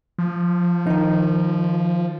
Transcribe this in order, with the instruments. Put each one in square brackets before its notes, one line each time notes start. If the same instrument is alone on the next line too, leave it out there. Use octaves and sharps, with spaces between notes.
[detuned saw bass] F3
[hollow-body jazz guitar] D#3 D#4